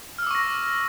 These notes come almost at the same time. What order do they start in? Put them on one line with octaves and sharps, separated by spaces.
F6 E6 D6 C#6 A#6